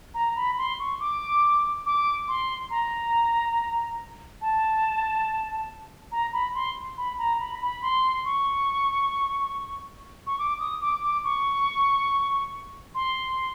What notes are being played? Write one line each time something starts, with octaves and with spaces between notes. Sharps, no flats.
A#5
B5
C6
C#6
D6
D6
C6
A#5
A5
A#5
B5
C6
B5
A#5
B5
B5
C6
C#6
C#6
D6
D#6
D6
D6
C#6
C6